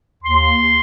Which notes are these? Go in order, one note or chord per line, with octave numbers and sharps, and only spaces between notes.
D#2 C6